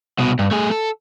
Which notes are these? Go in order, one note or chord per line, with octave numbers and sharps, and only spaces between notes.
C2 B2
G2
A3 G#4
A4